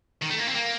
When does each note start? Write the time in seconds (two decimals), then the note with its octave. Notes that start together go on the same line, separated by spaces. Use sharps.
0.22 D#3
0.31 A3
0.39 A#3
0.48 C4
0.55 A#3